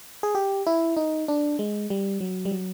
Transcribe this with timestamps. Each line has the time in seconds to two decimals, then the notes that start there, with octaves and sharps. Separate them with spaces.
0.23 G#4
0.35 G4
0.67 E4
0.97 D#4
1.28 D4
1.59 G#3
1.90 G3
2.21 F#3
2.45 G3
2.51 F#3